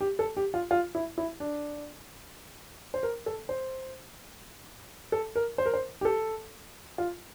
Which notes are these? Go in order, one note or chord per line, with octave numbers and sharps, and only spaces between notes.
G4
A4
G4
F4
F4
E4
E4
D4
C5
A#4
A4
C5
A4
A#4
C5
A#4
C5
G4
A4
F4